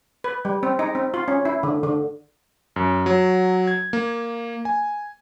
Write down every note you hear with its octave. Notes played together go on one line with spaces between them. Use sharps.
B4
G3
C4
D#4
C4
F4
C#4
E4
D3
D3
F#2
F#3
G#6
A#3
G#5